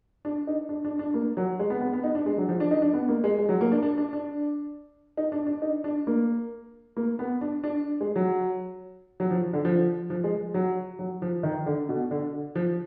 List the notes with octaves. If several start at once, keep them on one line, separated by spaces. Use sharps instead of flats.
D4
D#4
D4
D4
D4
A#3
F#3
G#3
B3
B3
B3
D#4
D4
G#3
F#3
F3
D4
D#4
D4
B3
A#3
G#3
G#3
F#3
A#3
D4
D4
D4
D4
D#4
D4
D4
D#4
D4
A#3
A#3
B3
D4
D4
G#3
F#3
F#3
F3
D3
F3
F3
G#3
F#3
F#3
F3
D#3
D3
B2
D3
F3